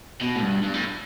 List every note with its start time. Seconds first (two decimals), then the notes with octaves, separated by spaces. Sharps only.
0.21 B2
0.36 A2
0.42 G2
0.63 G2
0.74 A2